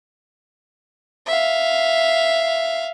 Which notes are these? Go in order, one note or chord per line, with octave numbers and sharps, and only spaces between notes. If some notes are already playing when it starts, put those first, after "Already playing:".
E5 F5